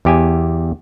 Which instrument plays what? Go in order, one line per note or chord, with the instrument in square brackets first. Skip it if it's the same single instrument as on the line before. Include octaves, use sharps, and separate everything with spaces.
[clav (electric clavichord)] E2 G4 G#5